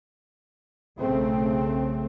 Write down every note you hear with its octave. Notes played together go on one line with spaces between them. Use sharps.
B1 C#3 A3 C4